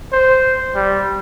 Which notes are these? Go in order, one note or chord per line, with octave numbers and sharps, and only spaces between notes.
C5
G3